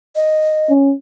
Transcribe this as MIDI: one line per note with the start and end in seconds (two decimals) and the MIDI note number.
0.16 0.72 75
0.69 0.94 61